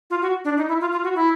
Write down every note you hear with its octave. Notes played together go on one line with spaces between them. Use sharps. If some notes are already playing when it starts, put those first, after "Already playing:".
F4
F#4
D4
D#4
E4
F4
F4
F#4
E4